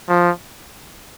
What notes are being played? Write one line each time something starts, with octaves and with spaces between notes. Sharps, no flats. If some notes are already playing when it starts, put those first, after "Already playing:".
F3